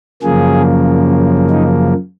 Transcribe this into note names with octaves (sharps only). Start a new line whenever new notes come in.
F#2 C#3 F3 A#3 G#4
D#4